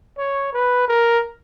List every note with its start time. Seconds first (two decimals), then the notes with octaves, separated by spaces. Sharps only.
0.18 C#5
0.53 B4
0.88 A#4